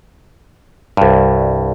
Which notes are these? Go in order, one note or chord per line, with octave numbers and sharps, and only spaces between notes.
C2 G2